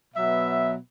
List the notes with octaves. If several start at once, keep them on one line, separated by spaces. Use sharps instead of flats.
B2 F#3 B3 E5